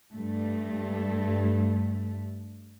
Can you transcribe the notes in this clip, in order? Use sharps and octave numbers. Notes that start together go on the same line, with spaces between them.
G2 A3